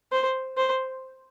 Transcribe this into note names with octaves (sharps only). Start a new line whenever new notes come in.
C5
C5